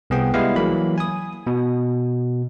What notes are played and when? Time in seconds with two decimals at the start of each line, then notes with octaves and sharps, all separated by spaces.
0.10 C2 B3 G#4 G5
0.34 G3 G#3 B3 E4 F5
0.55 E3 F#3 A#3 B5
0.98 G#5 D#6
1.47 B2